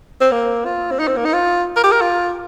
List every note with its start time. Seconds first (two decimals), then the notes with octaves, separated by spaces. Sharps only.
0.21 C4
0.32 A#3
0.65 F4
0.91 C4
0.99 D#4
1.07 C4
1.16 A#3
1.25 D#4
1.33 F4
1.76 A#4
1.83 G4
1.92 A#4
2.01 F4